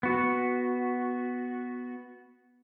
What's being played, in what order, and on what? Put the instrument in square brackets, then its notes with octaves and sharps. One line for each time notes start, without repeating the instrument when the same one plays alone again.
[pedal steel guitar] B3 F#4